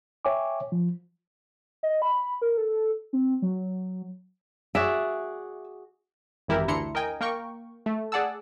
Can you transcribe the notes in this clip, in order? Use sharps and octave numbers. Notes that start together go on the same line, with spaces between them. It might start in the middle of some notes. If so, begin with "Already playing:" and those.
C#5 E5 G5 G#5 D6
F3
D#5
B5
A#4
A4
C4
F#3
F#4 G#4 D5 E5
G#1 F#2 E3 E4 G4 A#4
D2 D4 E4 A#5 C6 C#7
A#4 D#5 G5 G#5
A#3 A#4 G5 C#6
A3
G#4 D5 F#5 A5 E6